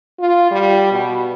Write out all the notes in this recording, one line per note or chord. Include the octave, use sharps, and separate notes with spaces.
F4
G3
B2